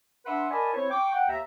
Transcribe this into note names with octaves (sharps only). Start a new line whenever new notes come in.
D4 B4 E5 F#5 C6
A#4 D5 D#5 G#5 A5 B5
C4 E4 C5 C#5
G5 C#6 D6
F#5 G5
D#2 E5 A#5